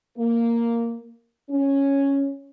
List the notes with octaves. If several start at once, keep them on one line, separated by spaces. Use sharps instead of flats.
A#3
C#4